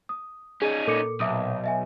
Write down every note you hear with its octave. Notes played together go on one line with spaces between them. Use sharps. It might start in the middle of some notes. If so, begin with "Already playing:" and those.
D#6
C#4 D#4 G#4
A#2 A4 D6 C#7
B1 E5 D6 D#6
D#5 E5 G#5